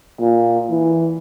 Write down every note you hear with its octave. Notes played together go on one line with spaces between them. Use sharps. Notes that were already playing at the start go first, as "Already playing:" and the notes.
A#2
E3